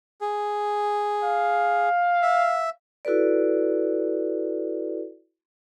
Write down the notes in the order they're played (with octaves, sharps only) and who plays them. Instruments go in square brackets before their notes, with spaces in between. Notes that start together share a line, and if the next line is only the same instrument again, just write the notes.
[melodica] G#4
[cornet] F5
[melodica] E5
[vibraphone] E4 F#4 A4 B4 D5